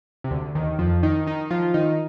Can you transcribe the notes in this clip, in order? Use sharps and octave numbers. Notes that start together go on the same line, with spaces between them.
C3
D2 D3
D#2 D#3
F2 F3
D#3 D#4
D#3 D#4
F3 F4
D#3 D#4